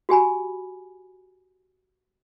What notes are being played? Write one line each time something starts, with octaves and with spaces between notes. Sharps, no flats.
F#4 G4 G#5 B5